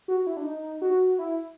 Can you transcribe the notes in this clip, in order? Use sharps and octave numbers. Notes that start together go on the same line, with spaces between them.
F#4
E4
D4
D#4
F#4
E4